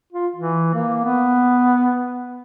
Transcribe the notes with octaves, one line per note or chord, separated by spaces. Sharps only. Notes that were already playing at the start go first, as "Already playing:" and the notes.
F4
E3
A#3
B3